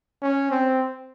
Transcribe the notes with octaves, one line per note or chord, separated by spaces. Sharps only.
C#4
C4